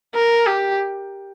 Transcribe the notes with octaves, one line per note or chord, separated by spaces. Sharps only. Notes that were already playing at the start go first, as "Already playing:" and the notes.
A#4
G4